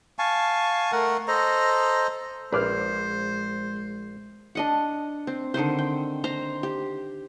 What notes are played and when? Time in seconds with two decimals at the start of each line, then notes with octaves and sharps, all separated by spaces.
0.19 F5 G#5 A5 C#6
0.92 A3 A#4 F#5
1.28 A4 C5 D#5 A#5
2.53 A#1 G#3 B4 C5 D6 F6
4.55 D4 D#5 F#5
5.27 C4
5.54 D3 D#3 C4 C5
5.78 G5
6.24 C5 A#5
6.63 G4